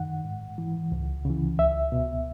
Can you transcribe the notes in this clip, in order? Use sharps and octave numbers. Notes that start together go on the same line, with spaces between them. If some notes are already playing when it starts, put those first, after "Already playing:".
Already playing: F#2 D#3 F#5
G#2
E3
C#2
C#3 E3
C#2 E5
B2